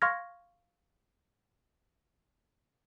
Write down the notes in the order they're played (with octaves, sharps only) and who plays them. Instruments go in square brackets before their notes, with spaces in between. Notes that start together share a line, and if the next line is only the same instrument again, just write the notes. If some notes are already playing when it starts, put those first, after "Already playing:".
[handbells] F5 C6 C#6 F6 G#6 A#6